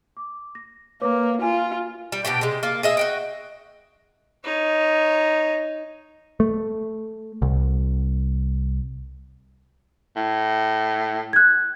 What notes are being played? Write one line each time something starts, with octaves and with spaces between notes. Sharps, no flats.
D6
A#6
A#3 B4 C#5 D6
F4 G#5
G3
B2 D4 G4 G5
C3 G#3
A#3 F4
G#4 D#5 E5
F#4 D#5 G5
D#4 C#5
A3
C2
A2
F#6 G#6